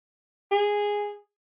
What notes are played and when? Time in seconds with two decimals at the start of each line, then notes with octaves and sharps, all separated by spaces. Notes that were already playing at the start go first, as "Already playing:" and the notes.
0.51 G#4